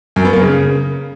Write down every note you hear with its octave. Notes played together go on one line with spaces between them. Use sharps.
F#2
B3
A#3
C#3